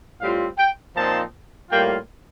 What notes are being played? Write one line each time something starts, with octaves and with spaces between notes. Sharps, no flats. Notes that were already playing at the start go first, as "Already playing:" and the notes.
A2 G3 C4 F4 F5
G5
A#2 F3 C4 D#4 A5
A2 G3 A#3 F4 G5